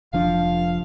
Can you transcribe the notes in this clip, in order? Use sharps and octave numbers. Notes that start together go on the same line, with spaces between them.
F1 F3 D4 F5